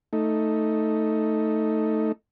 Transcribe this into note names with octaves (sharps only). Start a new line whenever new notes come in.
A3 D#4